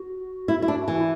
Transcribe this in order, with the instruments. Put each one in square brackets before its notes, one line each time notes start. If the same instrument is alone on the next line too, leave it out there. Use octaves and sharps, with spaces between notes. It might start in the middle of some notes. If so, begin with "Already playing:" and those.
Already playing: [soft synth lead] F#4
[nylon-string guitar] E4
E4
D4
E3
[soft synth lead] E4